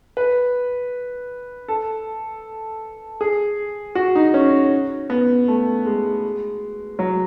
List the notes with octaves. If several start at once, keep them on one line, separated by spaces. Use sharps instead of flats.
B4
A4
G#4
F#4
D#4
C#4
B3
A3
G#3
F#3